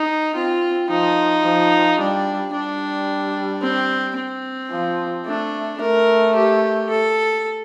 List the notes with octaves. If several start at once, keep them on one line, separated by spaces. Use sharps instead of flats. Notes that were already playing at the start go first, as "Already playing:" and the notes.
Already playing: D#4
C4 F4
F3 D#4
F3
G3 D4
G3 D4
C4
C4
F3
A3 D4
A3 A#4
G4
A4